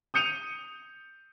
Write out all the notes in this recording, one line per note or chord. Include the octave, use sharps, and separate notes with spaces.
D#6 G6 C#7 D#7 F7